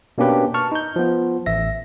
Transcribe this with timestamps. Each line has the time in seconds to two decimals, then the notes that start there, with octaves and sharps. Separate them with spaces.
0.18 B2 A#3 C#4 D4 G4 B4
0.54 A5 C#6 F6
0.72 D#4 G6
0.96 F3 B3
1.46 A1 E5 A#6